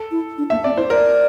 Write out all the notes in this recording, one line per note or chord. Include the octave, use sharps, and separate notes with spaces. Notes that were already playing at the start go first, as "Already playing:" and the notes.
Already playing: A4
E4
D4
A#3 E5
C4 D5
E4 C5
A#4 D5